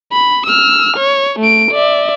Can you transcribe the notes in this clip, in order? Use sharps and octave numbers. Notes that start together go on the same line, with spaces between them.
B5
E6 F6
C#5
A3 D7
D5 E5